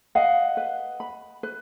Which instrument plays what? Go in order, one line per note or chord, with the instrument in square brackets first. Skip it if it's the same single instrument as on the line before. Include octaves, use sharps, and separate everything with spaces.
[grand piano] D#5 F#5 [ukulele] F5
[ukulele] B4
B5
B4